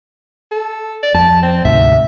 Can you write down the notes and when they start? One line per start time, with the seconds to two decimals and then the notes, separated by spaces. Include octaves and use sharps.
0.51 A4
1.03 D5
1.14 F2 A5
1.43 C4
1.65 D2 G#2 C3 E5